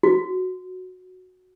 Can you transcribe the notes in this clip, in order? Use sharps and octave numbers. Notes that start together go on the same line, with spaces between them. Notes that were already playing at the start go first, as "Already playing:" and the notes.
F#4